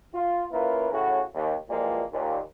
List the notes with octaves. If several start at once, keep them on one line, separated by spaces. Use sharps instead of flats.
F4
A#3 C#4 E4 F4 A#4 B4
A2 C#3 F#4
D#2
A#2 E3 F3 G3 G#3 A#3
D#2 A#2